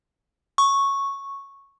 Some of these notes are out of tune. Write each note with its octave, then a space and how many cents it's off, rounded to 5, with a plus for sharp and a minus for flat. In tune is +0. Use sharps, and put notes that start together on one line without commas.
C#6 -5